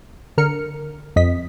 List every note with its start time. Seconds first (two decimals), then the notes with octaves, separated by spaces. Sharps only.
0.37 D3 A#4 F6 C#7
1.16 F2 D#5 B6